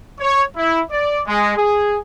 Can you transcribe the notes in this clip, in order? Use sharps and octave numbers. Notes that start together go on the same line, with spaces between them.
C#5
E4
D5
G#3
G#4